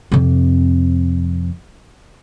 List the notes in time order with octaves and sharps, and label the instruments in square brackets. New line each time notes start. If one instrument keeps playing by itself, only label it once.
[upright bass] F2 C3